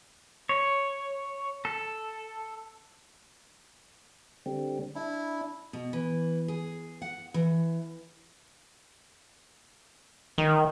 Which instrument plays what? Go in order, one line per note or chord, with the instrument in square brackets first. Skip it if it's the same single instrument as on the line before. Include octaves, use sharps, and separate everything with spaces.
[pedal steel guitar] C#5
A4
[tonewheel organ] D3 G3 C4
[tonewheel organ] D4 [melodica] E4
[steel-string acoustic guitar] B2
E3
G#4
F#5
E3
[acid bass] D#3